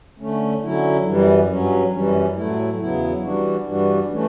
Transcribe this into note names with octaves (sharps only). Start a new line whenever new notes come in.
D3 A3 C#4
D3 F#3 C#4 E4
F#2 E3 G3
G2 F#3 C#4
F#2 E3 G3 C#4
A2 F#3 A3 E4
E2 C#3 F#3 B3 E4
E3 G3 D4 F#4
G2 E3 G3 D4 F#4
E3 A3 C#4